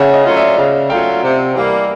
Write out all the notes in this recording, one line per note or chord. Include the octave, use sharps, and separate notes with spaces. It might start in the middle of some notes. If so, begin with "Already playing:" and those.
Already playing: C#3 E5 F#5
D#5 F5
F#3 A3 C#4 F4
D5 E5
C#3 D#5 F5
F#3 A3 C#4 F4 F5 G5
C3
E3 G3 A#3